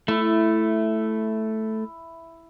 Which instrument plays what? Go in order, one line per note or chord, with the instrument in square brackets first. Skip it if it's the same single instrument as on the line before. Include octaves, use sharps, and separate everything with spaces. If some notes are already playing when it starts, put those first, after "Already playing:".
[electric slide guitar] A3 [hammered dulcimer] E4